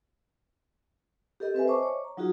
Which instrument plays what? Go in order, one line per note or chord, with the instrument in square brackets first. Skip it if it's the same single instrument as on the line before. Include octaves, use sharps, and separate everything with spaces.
[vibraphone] G4 A4 A#4 D#5
C4 B4 E5 G#5
C5 D#5 A5 C#6 D6
C#5
A#5
F#3 D#4 F4 F#4 G#4